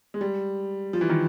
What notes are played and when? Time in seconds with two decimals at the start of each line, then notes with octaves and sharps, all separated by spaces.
0.14 G#3
0.21 G3
0.93 F3
1.01 E3
1.09 D#3